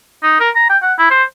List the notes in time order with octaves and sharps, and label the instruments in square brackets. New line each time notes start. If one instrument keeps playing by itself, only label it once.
[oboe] D#4
A#4
A#5
G5
F#5
E4
C5